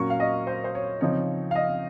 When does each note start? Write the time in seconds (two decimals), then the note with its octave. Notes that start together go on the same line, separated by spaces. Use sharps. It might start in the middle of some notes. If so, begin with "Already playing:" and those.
Already playing: A#2 F#3 C#4 C#6
0.10 F5
0.20 D#5
0.47 C5
0.64 C5
0.75 C#5
1.01 C#3 F3 C4 D#4 C#5
1.51 F5
1.55 D#5